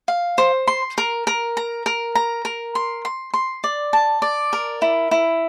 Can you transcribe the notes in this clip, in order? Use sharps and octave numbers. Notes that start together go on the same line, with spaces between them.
F5
C5
C6
A#4
A#4
A#5
A#4
A#5
A#4
C6
C6
C6
D5
A5
D5
A#4
E4
E4